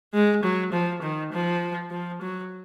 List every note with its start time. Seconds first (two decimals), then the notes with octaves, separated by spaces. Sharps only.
0.14 G#3
0.43 F#3
0.72 F3
1.02 D#3
1.32 F3
1.91 F3
2.21 F#3